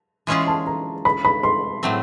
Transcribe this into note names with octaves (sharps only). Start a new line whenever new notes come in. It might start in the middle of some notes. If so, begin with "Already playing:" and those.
E3 G#3 C#4 F4 G#4
A5
A#5
B5
B5
C6
A2 F#3 A3 C4